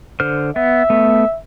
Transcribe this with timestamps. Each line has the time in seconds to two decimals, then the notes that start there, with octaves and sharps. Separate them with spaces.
0.20 D3 C5 F6
0.56 B3 E5
0.90 A3 B3